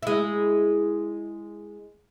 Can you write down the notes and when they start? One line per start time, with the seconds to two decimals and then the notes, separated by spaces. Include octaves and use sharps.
0.03 G#3 E4